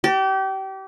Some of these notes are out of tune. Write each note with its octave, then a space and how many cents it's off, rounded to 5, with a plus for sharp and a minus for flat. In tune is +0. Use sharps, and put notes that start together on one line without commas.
G4 -30